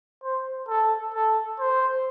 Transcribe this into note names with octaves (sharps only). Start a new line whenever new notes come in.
C5
A4
A4
C5